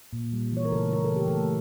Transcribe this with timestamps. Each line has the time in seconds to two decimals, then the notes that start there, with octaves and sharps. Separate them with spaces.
0.13 A#2
0.33 G3
0.52 E3 C#5
0.65 A#4
0.72 C#3 A3 A4
0.93 A#3 A#4
1.05 A4
1.12 E3 G4
1.28 A3 A4
1.33 E3